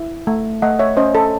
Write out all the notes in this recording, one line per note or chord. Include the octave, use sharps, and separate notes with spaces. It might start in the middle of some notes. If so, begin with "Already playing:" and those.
Already playing: E4
A3
A3 D#5 F#5
C#5 E5
C#4 C5 D#5
A4